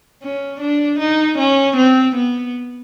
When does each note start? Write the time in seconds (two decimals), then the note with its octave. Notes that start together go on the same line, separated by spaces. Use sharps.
0.23 C#4
0.61 D4
1.00 D#4
1.38 C#4
1.77 C4
2.16 B3